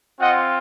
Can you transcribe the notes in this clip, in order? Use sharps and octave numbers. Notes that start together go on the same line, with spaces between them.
C4 F4 D#5 F#5